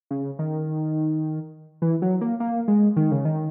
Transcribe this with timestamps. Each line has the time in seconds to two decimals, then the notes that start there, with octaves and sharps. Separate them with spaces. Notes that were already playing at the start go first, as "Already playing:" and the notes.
0.11 C#3
0.39 D#3
1.82 E3
2.02 F#3
2.21 A#3
2.40 A#3
2.68 G#3
2.96 D#3
3.11 C#3
3.25 D#3